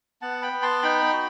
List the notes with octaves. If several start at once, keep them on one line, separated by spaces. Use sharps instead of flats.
B3 F#5 A5
G5 B5
B3
A5 C6
D#4 G5 B5
F#4